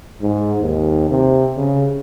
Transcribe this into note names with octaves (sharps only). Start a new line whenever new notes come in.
G#2
D#2
C3
C#3